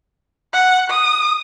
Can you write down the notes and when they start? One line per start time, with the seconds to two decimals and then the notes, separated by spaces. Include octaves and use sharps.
0.53 F#5
0.90 D#6